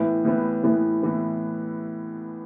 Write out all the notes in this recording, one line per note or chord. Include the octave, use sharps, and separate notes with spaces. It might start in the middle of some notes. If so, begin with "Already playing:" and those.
Already playing: A2 E3 B3
A2 E3 B3
A2 E3 B3
A2 E3 B3